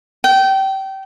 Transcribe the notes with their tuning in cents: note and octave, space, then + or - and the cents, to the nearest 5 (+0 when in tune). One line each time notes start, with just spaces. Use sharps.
G5 -25